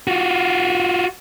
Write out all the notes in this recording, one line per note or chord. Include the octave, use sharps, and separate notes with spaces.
F4 F#4